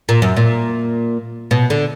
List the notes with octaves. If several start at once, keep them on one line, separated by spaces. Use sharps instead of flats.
A#2
F#2
A#2
B2
D3